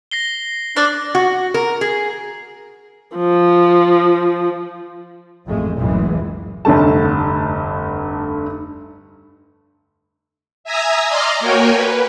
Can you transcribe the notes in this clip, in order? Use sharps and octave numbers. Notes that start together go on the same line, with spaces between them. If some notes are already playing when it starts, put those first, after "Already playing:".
A#6 C7 G7
D4 D5 F6 F#6
F#4
A#4
G#4
F3
A1 F2 G#3 A3
F#1 C#2 F#2 A2 E3 G#3
F1 D2 G2 G3 A3 A5
E5 G#5 A#5 D#6 E6
D5 D#5 A#5 C6 D6 F6
A#3 F#4 A#4 C#5 G5 G#5
B4